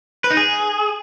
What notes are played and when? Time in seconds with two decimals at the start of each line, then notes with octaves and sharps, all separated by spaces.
0.24 B4
0.31 D#4
0.37 G#4